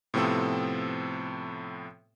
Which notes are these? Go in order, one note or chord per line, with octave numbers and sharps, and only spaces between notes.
A2 C3 F3 B3 C4 A4